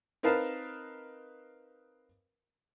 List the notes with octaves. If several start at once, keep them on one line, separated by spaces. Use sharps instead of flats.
C4 D#4 A#4 B4 F5 A5